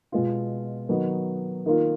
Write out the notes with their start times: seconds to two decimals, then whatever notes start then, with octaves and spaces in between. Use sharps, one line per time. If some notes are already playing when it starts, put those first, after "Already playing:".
0.12 B2 G#3 B3 F4
0.89 D#3 F#3 B3 D#4 F#4
1.66 D#3 A#3 F4